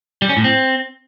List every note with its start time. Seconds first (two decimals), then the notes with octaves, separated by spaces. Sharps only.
0.22 G3
0.29 C#4
0.37 A2
0.44 C4